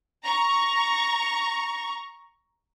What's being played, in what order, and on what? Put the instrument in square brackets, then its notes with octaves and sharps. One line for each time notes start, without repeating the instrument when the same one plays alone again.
[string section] A#5 C#6